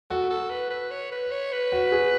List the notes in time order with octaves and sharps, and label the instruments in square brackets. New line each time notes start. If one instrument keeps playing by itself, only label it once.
[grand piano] F#4 [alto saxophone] A4
[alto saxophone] A4
B4
B4
C#5
B4
C#5
B4
[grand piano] F#4
G#4